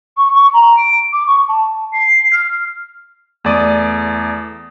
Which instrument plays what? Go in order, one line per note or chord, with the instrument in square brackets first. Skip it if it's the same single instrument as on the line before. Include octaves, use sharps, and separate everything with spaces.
[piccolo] C#6
C#6
A#5
D7
D6
C#6
A5
C7
F6
[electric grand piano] E2 A3 D5 D#6 D#7